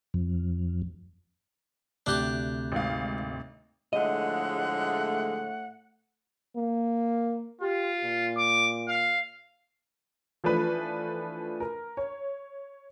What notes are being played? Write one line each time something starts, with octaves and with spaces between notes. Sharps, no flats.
F2
D2 C3 D4 G4 D6 F#6
G#1 F5
A2 D3 F3 G#3 A3 D#5 F#5
A#3
F4 G4
A#2
D6
F5
E3 F3 A3 D4 B4
A#4
C#5